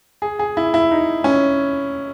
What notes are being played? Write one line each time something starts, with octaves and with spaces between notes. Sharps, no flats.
G#4
G#4
E4
E4
D#4
C#4